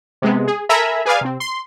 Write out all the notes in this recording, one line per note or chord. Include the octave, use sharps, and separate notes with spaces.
C3 G#3 B3
G#4
A4 A#4 E5 G#5 A#5 B5
G#4 B4 D5 F5 G#5
C3 C4
C6